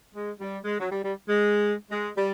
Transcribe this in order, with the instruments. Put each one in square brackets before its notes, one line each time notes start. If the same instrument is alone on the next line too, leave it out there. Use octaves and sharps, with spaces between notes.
[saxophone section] G#3
G3
G#3
F#3
G3
G3
G#3
G#3
G3